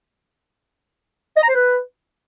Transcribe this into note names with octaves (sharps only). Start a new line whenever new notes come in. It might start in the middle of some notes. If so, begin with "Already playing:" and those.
D#5
A#5
C5
B4